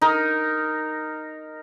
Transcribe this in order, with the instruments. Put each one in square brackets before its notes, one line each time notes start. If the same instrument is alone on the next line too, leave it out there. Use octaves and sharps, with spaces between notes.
[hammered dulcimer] D#4 A#4